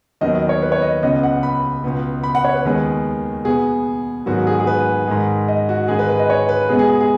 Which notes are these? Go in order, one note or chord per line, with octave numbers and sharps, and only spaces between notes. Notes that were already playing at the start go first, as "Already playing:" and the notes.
D#2 D#3 F#3 B3 D#5
D#5
C#5
B4
C#5
D#5
C#2 C#3 B3 D#5
F#5
B5
C#2 B2 B3
B5
F#5
C#5
B4
D#2 D#3 G#3 B3
B2 B3 G#4
G#2 D#3 F#3 B3 F#4
G#4
G#4
B4
G#2 D#3 G#3
D#5
F#4
G#2 D#3 G#3 G#4
B4
B4
D#5
C#5
B4
B2 G#3 B3 G#4
G#4
G#4
G#4